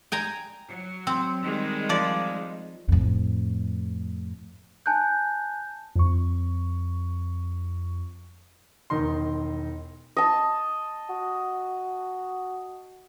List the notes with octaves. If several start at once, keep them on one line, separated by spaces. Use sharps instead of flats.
G5 G#5 A#5
F#3
C4
D#3 G3 G#3
F3 D5
F2 A2
G#5 A5 F#6 G6
F2 C#6
E1 D#3 D#4 C6
D#5 A5
F#4